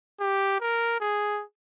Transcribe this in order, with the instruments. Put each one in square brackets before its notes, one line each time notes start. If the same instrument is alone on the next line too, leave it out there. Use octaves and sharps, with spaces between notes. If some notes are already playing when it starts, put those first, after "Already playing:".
[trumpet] G4
A#4
G#4